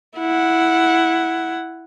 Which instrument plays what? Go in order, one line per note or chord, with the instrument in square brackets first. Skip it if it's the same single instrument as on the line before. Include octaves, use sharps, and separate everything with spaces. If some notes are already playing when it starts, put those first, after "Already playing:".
[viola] E4 F#5